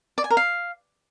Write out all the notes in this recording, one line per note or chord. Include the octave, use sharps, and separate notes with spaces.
D5
G#5
A#4
F5